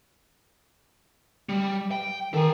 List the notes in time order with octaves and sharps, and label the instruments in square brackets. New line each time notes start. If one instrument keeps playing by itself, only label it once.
[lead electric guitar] G3
G5
[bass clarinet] D#3 [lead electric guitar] A4 G#5